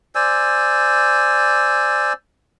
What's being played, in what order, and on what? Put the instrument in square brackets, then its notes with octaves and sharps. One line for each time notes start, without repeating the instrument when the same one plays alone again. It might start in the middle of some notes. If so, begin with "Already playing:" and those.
[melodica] C5 D5 G#5 E6